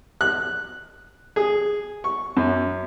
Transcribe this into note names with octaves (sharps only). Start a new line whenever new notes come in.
F#6
G#4
C#6
F#2